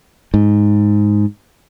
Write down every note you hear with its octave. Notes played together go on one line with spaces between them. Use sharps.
G#2